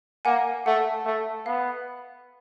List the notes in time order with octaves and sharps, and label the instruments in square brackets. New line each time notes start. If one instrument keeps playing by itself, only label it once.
[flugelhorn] A#3 [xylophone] F#5 G#5
[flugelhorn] A3 [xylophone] F#5
[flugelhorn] A3
[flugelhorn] B3 [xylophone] F5